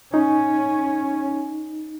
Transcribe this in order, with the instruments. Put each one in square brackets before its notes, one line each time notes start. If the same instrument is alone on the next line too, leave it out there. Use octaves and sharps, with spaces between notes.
[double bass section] C#4 [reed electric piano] D#4